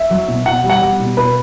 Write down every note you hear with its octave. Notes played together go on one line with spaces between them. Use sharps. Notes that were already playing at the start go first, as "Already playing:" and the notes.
Already playing: E5
F#3
B2
B2 F#5
G3
F#5
G3
B2
B2 B4